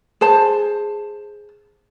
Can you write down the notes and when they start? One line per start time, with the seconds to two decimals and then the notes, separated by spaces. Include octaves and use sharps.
0.21 G#4 C5 A5